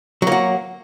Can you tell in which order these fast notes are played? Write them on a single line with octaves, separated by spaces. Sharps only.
F#3 A#3 F#4